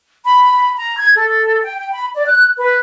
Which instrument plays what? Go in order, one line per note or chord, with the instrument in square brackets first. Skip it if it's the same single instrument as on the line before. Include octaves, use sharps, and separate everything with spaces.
[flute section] B5
A#5
G#6
A4
G5
G5
B5
D5
F#6
B4